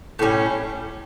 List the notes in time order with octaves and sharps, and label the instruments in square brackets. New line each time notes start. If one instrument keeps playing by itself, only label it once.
[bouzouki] A2 G3 C#4